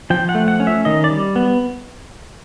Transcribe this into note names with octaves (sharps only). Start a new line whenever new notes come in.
F3 G5
F#5
A3
F#5
C#4
E5
D#3 D#5
D5
G3
B3